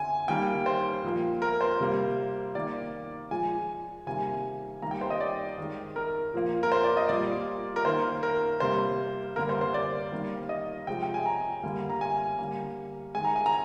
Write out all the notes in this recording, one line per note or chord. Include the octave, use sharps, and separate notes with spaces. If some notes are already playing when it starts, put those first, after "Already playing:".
Already playing: D3 G#5
D#3 G3 A#3 G5
C5
A#2 F3 A#3
A#4
C5
C3 G3 A#3
D#3 A#3 D5
A#2 F3 G#3 G#5
C3 D#3 G3 A#3 G#5
D#3 G3 A#3 A#5
G5
C5
D#5
D5
D#3 G#3
A#4
A#2 F3 A#3
A#4
C5
D5
D#5
A#2 G3 A#3 D5
A#4
D#3 A#3 C5
A#4
C3 G3 A#3 C5
D3 G3 A#3 A#4
C5
C5
D5
D#3 G3 A#3
D#5
C3 F3 G#3 G5
G5
G#5
A#5
D3 G3 A#3
A#5
G#5
D3 G3 A#3
D#3 G#3 G#5
A#5
G#5
A#5